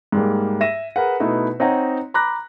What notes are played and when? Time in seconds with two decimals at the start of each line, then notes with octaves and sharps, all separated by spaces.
0.12 G#2 G3 A#3
0.61 E5 A#6 D#7 E7
0.96 G#4 A#4 B4 F#5
1.20 B2 A3 B3 D#4 E4
1.60 C4 D#4 C#5 D#5 F#5 A#5
2.14 A#5 B5 D6 F#6 A#6